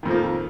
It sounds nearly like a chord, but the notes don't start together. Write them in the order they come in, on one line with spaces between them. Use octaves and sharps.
D#3 F2 F3 A#3